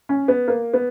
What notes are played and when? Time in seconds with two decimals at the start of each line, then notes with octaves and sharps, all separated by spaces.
0.09 C#4
0.28 B3
0.48 A#3
0.74 B3